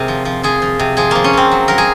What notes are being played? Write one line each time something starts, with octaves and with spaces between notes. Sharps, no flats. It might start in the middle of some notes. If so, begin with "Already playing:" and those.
Already playing: C3 G#4 A#4
F3
F3
F3 G#4
F3
C3
F3 G#4
F3 A#3
C#4
F3 C4
F#3
F#3 A#4
G#4